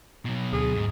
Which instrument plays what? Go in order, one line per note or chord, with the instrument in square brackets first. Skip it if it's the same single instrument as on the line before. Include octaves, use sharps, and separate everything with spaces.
[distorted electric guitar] B2 F#3
[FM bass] D2 [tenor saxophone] G#4
[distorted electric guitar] G#2